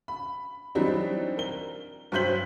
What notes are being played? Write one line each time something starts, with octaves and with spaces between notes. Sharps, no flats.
B5
E3 F#3 G3 C4 D4 D#4
A#4 G7
G2 F#3 C5 G6 B6 F#7